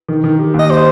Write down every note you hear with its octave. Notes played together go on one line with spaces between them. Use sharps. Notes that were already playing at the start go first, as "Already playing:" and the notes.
D#3
D#3
G4
D#2
D#5
G4 C5